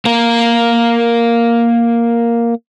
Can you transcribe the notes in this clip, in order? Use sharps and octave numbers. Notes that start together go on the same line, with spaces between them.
A#3 A#4